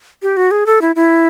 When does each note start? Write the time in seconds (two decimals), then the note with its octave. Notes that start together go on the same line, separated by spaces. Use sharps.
0.23 G4
0.37 F#4
0.51 G#4
0.66 A4
0.81 E4
0.96 E4